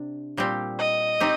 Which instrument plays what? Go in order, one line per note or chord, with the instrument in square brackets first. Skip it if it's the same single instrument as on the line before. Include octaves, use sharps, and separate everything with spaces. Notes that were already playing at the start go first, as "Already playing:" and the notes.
Already playing: [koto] C3 D4
A#2 G3 C4 G4
[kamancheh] D#5
[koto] C4 D#4 G4